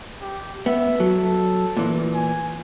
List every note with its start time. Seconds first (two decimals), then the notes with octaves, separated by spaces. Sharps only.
0.22 G4
0.66 B3 E5
1.00 F#3 A4
1.77 A#2 E3
2.14 G#5